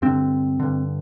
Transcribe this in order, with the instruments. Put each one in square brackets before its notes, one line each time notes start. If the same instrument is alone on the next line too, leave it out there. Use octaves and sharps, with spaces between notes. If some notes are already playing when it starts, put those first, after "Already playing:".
[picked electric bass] G2 D3 C4
G2 D3